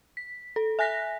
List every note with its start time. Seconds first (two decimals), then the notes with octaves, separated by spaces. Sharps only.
0.17 B6
0.56 A4
0.79 E5 G#5 F#6 A#6 B6